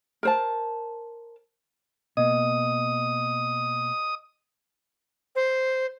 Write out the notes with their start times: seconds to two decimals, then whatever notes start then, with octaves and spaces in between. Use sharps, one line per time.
0.23 A#4 C5 A5
2.17 B2 A#3 D#5 D#6
5.36 C5